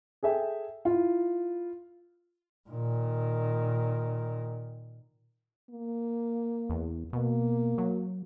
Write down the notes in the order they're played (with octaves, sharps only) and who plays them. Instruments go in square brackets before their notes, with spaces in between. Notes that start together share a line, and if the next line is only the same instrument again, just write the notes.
[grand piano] G#4 A4 E5 G5
E4 F4
[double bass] A#2 D#3
[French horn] A#3
[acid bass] E2
[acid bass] B2 [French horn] A#3
[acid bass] F#3